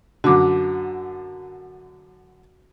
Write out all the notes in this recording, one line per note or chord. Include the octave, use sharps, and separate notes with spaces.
F#2 D3 F#4 D6